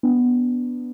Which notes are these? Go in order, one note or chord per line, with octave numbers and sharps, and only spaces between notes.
B3 D4